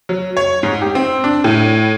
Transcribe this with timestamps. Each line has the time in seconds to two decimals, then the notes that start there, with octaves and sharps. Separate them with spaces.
0.09 F#3
0.37 C#5
0.63 G#2
0.82 G4
0.95 C4
1.24 D4
1.44 A2